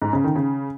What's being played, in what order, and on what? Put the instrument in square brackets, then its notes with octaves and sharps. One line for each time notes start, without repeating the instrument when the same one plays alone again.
[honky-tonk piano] G#2
C#3
D#3
C#3